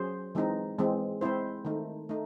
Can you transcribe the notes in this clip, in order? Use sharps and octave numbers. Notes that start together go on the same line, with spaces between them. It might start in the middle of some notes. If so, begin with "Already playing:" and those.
Already playing: F#3 C#4 G#4 C5
E3 G#3 C4 D#4 G#4
E3 G#3 C4
G#3 C4 E4 C5
D#3 A3 D#4
A3 D#4